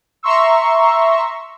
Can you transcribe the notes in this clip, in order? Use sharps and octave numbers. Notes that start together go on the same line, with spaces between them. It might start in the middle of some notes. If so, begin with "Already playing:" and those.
E5 A#5 C6 C#6 E6